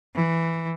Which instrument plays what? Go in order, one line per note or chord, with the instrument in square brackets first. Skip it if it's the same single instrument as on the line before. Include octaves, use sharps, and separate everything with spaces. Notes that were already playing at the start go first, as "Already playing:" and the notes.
[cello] E3